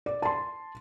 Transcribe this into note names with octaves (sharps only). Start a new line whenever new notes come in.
D5
A5 C6